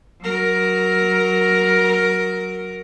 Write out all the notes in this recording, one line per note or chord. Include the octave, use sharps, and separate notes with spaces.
F#3 A#4